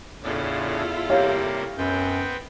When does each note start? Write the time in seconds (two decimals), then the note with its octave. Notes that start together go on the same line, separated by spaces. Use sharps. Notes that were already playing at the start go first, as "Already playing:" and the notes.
0.23 E2 A2 C#3 D4 E4 F4 A4
1.10 C3 G3 A#3 G4 C#5 F5
1.78 F#2 B3 C4 G5